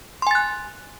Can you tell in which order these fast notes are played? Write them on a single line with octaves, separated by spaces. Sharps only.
C6 G#5 A6 F#6